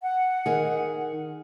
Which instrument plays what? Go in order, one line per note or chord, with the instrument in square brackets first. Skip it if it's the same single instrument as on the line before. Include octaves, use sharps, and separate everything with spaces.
[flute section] F#5
[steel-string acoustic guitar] D#3 G#4